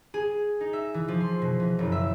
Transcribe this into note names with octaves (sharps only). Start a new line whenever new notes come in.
G#4
D#4
E5
E3
F3
C6
B2
E3
F#1
E5